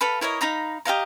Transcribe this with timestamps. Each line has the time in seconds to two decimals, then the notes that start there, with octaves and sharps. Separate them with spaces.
0.01 A4 B4 F5 B5
0.21 E4 A#4 C#5 D#5
0.41 D#4 F5 A#5 B5
0.85 G4 D#5 F5 A#5